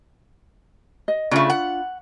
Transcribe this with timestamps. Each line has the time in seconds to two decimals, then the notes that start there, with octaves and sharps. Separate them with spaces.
1.08 D#5
1.31 C#3 A3 D4 F4 B5
1.50 F#5